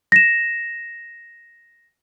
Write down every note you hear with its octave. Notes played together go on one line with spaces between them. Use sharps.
A#6 E7